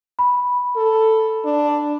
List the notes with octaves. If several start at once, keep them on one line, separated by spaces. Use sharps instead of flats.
B5
A4
D4